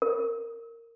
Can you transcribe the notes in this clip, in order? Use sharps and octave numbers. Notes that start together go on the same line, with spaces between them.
A#4